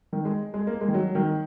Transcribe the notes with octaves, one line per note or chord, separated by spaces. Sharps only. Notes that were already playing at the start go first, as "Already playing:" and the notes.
D#3
G#3
G#3
A#3
G#3
D#3
F#3
D#3